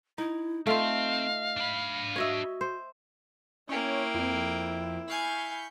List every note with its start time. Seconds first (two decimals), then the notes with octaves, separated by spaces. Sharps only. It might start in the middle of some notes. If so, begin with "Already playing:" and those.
0.18 D#4 E4
0.67 A3 C4 F4 D#5 F5
1.57 D4 B5
2.16 F#4 C#5 D#5 E5
2.61 C5
3.69 A#3 C#4 E4 C#5 G5
4.14 F2
5.08 F5 G#5 B5 C#6 G6